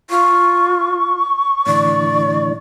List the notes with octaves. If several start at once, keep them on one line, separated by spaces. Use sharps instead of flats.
F4 C#6
A2 D3 E3 D5